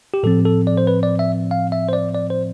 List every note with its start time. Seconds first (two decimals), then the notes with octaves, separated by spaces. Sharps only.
0.14 G4
0.23 A2 F3 C4 A4
0.45 A4
0.67 D5
0.78 C5
0.87 B4
1.03 D5
1.19 E5
1.51 F5
1.72 E5
1.89 C5
1.93 D5
2.15 D5
2.30 C5